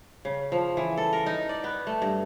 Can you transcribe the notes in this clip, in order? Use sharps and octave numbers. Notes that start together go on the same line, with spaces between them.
C#3
F3
E3
A4
A#4
D#4
D5
B3
A3
G2